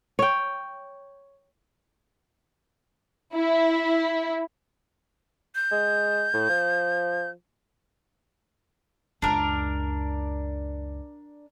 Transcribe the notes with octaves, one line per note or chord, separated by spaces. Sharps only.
C#5 G5
E4
G6
G#3
A2
F3
C#2 F#2 D4 A#4